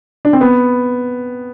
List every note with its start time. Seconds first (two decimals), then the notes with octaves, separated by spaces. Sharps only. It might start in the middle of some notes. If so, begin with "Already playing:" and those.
0.25 D4
0.33 C4
0.41 B3